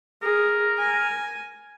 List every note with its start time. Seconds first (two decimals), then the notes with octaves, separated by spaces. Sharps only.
0.23 G#4 A#4
0.79 G#5